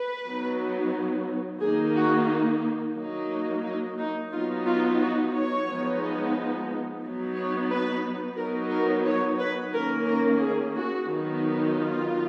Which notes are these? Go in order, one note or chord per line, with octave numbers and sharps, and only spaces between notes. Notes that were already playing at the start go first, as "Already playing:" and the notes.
Already playing: B4
F#3 B3 D#4
D#3 A#3 D#4 G#4
F#4
F#3 A#3 D#4
D#4
D#4
F#3 B3 D#4 F4
F4
F#4
C#5
F3 G#3 B3 D#4
F#3 B3 D#4
C#5
B4
F#3 B3 D#4 A#4
A#4
C#5
B4
D#3 A#3 C#4 A#4
A#4
G#4
F#4
D#3 F#3 B3 D#4
F4